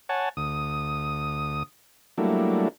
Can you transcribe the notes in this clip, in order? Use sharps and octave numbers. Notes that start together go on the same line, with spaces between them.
C#5 F#5 G#5 A5
D2 D#6
F#3 G3 A3 A#3 D4 E4